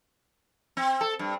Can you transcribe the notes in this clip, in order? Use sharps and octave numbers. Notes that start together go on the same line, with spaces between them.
C4
A4
G2